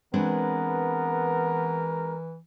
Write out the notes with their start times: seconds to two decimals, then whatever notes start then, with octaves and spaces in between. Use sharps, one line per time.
0.14 E3 G#3 B3 C4 D4 A#4